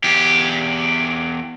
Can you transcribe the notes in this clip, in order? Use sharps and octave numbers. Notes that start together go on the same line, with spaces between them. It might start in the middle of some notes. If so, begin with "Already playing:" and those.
E2 G4